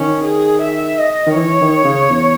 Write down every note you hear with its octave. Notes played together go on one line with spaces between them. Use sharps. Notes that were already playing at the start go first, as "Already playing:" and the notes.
Already playing: D#3 C#4
G#4
E5
D#5
D#3
E3 C#5
D#3
C#3
E2